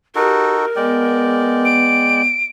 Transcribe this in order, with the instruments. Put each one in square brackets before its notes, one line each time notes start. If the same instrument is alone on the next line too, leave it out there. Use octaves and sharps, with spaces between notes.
[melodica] D#4 F#4 A4 [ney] G4 [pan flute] A#4
[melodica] G#3 D5 G5 [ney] B3
[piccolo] D7